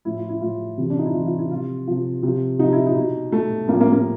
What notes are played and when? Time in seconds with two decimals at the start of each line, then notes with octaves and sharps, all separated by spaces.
0.05 A2 F3 E4
0.17 F4
0.29 E4
0.41 A2 F3 F4
0.78 C3 E3
0.90 D4
0.99 D#4
1.06 E4
1.14 C3 E3 F4
1.26 F4
1.38 E4
1.51 C3 F3 F4
1.87 C3 F3
2.23 C3 F3
2.59 C3 F3 D#4
2.73 E4
2.86 D#4
2.96 B2
3.32 B2 A3
3.68 A2 A#3
3.72 F3
3.81 A#3
3.92 A#3